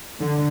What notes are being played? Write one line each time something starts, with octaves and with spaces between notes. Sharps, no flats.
D3